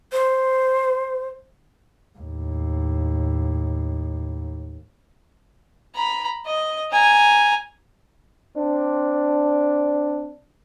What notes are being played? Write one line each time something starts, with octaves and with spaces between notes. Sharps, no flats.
C5
D#2 A2
A#5 B5
D#5
G#5 A#5
C4 D4